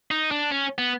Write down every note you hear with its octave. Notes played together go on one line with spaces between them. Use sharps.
D#4
D4
C#4
B3